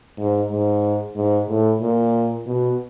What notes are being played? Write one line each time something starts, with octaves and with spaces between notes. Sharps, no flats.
G#2
G#2
G#2
A2
A#2
B2